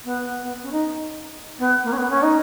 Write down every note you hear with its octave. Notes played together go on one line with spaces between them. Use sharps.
B3
B3
C#4
D#4
B3
A#3
C#4
B3
C#4
D#4